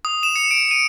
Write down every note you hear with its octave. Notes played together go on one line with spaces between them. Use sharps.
D#6
E7
C#7
D7
D#7